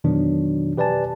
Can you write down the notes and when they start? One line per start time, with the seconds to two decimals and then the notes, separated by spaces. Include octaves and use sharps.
0.04 F2 B2 D#3 E3 F#3 D4
0.77 G4 B4 D5 G#5 A5